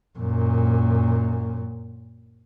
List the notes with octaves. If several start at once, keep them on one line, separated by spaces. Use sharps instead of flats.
F#2 A#2